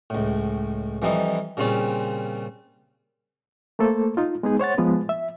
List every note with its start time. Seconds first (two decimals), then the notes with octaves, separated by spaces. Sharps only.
0.10 C#2 A2
1.02 F2 E3 F3 G3 D#4 E4
1.57 A#2 C#3 G3 C4 C#4 F4
3.79 A3 A#3 A4 C5
4.17 D#4 F4
4.43 G#3 B3 D#4 G#4
4.59 C5 C#5 F#5 A6
4.78 F3 G#3 B3 B4
5.09 E5